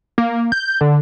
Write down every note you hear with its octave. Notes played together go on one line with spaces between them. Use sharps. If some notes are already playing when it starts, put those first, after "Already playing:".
A#3
G6
D3